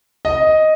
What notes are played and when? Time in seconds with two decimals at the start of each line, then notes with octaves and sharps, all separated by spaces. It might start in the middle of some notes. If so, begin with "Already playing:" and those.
0.25 D#5